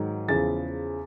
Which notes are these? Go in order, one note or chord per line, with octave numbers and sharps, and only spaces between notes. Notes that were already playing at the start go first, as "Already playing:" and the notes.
Already playing: G#2 D#3 F#3
E2 C#3 F3 A6